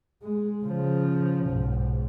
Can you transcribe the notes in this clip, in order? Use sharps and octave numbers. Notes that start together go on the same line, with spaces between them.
G#3
C#3 F3
B1 G#2